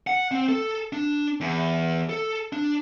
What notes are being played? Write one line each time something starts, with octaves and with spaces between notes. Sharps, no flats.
F#5
C4
A4
D4
E2
A4
D4